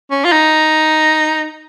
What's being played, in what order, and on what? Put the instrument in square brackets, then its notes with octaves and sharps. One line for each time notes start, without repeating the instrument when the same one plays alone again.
[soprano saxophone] C#4
F4
D#4